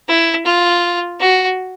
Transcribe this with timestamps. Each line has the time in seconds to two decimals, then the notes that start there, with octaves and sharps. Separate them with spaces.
0.08 E4
0.46 F4
1.20 F#4